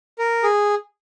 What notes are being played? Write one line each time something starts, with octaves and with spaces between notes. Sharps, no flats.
A#4
G#4